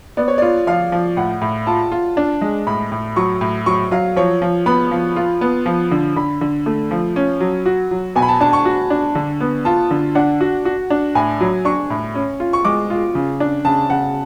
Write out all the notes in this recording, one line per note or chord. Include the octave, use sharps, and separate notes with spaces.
B3 D5
C#5
F4 D5
F3 F5
F3
A2 F#5
A2
F4 A5
F4
D4
G#3
A2 B5
A2
F#3 C#6
A2
F#3 C#6
F#3 F5
F3 C#5
F3
B3 B5
F3
F4
B3
F3
D3
D3 B5
D3
A3
F3
C#4
F#3
F#4
F#3
B2 G#5
B5
A5
D4 A5
C#6
F#4
D4
D3
B3
F4 A5
D3
D4 F#5
F#4
F#4
D4
A2 G#5
F#3
D4 C#6
A2
C#4
F4
C#6
G#3 D6
F4
C#3
D4
C#3 A5
C#3 F#5